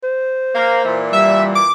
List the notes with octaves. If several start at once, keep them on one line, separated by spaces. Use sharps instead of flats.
C5
A#3
A#2 E3
G3 E5
D6